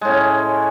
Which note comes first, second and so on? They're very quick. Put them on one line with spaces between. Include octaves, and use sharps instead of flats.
G#3 A2 C#4